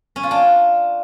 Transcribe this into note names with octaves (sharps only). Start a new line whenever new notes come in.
C#4
F4
D4